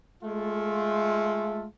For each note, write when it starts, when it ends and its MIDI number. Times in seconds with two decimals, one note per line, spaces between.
0.23 1.67 56
0.23 1.67 57
0.23 1.67 65